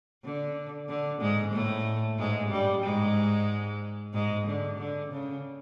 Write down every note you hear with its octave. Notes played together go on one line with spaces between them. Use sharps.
D3
D3
G#2 G#3
A2 A3
G#2 G#3
G2 G3
G#2 G#3
G#2 G#3
D3
D3
C#3